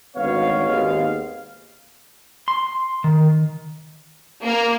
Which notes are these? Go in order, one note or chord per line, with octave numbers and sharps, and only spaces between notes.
G#1 D2 B3 C#5 F5
G#1 D#2 G#3 B3 F5
C6
D#3
A#3